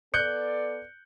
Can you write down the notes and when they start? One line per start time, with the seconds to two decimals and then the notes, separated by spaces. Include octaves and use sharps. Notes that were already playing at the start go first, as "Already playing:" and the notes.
0.14 B3 A4 D5 F#6 G6 C#7